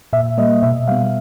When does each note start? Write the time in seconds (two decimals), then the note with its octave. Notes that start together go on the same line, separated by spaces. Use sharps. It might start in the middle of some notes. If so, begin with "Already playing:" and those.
0.13 A#2 E5
0.38 G3 A#3 D#5
0.63 B2 E5
0.88 G3 B3 F5